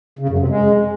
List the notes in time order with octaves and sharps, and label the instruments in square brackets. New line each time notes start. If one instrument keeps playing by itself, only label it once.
[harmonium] C#3
F#2
C3
G#3